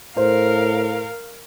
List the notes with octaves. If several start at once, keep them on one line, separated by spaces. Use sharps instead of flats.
A2 A#4 C5 F5